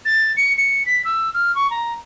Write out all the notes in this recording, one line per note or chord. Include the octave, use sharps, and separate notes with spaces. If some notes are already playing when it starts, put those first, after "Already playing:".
A6
C#7
C#7
B6
E6
F6
C#6
A#5